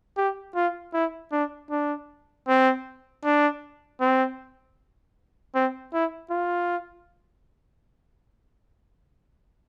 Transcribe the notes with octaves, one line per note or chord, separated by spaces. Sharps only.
G4
F4
E4
D4
D4
C4
D4
C4
C4
E4
F4